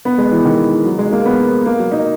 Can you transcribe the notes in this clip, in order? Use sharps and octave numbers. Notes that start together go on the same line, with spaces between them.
B3
G#3
E3
D#3
F#3
G#3
A#3
B3
A#3
F#3
D#4